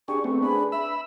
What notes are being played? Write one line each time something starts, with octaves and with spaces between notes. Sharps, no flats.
D4 G4 G#4 C#6
A3 B3 C4
D4 G#4 B4 B5
E5 B5 E6